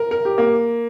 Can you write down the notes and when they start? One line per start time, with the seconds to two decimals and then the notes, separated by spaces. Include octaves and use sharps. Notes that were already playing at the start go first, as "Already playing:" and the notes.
Already playing: A#4
0.11 A#4
0.25 G4
0.38 A#3